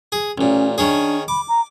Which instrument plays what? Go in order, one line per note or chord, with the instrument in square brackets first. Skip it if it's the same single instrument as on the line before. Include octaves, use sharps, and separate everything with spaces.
[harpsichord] G#4
[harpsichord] A1 A#2 [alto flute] C#4
[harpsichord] D#3 C#4 G#4 [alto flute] D4
[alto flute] B5 [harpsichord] D6
[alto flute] A#5